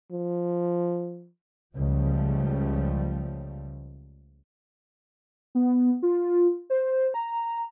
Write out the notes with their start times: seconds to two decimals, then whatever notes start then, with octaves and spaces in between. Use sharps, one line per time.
0.12 F3
1.76 C#2 C#3 F3 G3 A3
5.55 B3
6.03 F4
6.70 C5
7.14 A#5